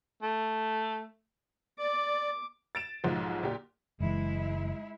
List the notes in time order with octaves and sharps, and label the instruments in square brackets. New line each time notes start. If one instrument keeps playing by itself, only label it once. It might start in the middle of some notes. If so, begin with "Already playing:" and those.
[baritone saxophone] A3
[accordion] D5 [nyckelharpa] D6
[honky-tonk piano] A6 D7 E7
B1 G#2 F3
A#2 G4
[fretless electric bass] F#1 E3 [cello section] G#3 E4